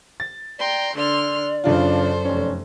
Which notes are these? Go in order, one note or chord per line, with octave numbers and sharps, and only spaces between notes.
A6
D5 G5 A#5 C6
D3 D5 C6 F6
F#2 C#3 D4 F4 A4 C5
F1 C#4